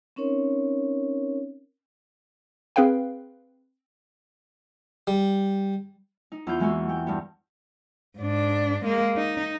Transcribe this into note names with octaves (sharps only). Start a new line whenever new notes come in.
C4 C#4 D#4 A#4 C#5
C4 G#4 B4 F5 G5
G3
D#4
E2 B3 F4 G6
E3 G#3 A#3 F#4
G#3 G5
G2 B3
G#2 D4
G#3 A#3
D#4